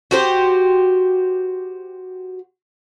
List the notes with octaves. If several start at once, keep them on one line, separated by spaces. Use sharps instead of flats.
F#4 G4 C5